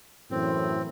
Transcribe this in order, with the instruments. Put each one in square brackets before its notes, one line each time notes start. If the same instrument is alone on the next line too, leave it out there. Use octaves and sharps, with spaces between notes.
[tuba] F#2 [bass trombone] A2 [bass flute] E3 [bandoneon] C4